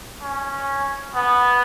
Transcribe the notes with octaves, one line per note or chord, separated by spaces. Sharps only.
C#4
B3